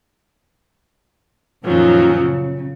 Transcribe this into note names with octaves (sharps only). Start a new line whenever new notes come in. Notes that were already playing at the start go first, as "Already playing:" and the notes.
F#2 A#2 D#3 F3 F#3 C#4
C#3